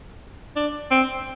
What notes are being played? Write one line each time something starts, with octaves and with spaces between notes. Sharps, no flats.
D4
C4